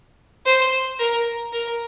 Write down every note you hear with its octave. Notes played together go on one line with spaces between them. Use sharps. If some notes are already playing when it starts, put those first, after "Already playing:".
C5
A#4
A#4